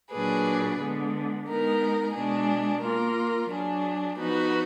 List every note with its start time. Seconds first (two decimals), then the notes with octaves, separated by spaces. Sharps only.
0.12 A#2 F#3 D4 G#4 B4
0.79 D3 G#3 B3
1.47 G#3 B3 D#4 A#4
2.14 B2 G#3 D4 G#4
2.82 A#3 F4 A#4
3.49 F#3 D4 G#4
4.17 F3 B3 D#4 F#4 B4